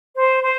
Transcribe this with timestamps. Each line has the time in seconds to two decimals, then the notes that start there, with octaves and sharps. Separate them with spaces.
0.16 C5
0.42 C5